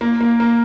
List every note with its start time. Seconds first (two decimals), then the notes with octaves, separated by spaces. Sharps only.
0.01 A#3
0.21 A#3
0.40 A#3